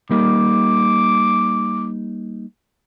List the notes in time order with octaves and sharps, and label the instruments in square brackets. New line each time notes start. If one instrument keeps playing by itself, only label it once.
[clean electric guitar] G3 A#3 D#4 [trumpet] D6